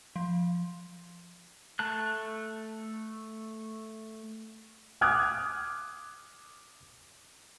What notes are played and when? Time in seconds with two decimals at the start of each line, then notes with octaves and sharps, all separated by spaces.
0.16 F3
1.79 A3 A5 F#6
5.01 D6 D#6 F6 F#6 G#6